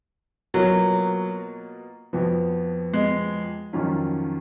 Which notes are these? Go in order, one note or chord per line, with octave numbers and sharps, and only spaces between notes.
B2 F#3 A#3 F4
F2 F3 B3 F#4
G#3
F2 D#3 F#3 C#4 F4